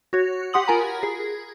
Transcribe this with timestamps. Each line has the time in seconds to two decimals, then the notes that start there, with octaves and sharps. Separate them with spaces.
0.13 F#4 C#5
0.53 G4 F#5 C6 D#6 F#7
0.68 F4 A#4 G#5 A#5 B5
1.03 G#4